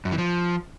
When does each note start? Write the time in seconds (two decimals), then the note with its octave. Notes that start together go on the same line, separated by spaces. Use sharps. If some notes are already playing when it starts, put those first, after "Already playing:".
0.05 F#2
0.12 E3
0.18 F3